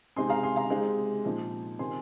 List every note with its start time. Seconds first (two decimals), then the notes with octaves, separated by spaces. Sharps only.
0.16 C3 G#3 C4 D#4 G#5 C6
0.30 F5 A#5
0.43 G#5 C6
0.56 F5 A#5
0.70 C3 G#3 C4 D#4
1.25 A#2 F3 C4 D#4
1.79 C3 D#3 C4 G#5 C6